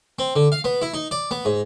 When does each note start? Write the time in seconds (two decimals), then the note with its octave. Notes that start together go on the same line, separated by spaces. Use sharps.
0.19 C4
0.36 D3
0.52 F5
0.64 B3
0.82 E4
0.94 D#4
1.11 D5
1.31 B3
1.45 G#2